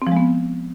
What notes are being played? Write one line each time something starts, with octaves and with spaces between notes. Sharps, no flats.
F3 G#3 B3 C4